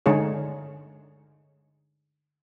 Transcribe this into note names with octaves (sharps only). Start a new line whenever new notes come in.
D3 G#3 D#4 G#4 C#5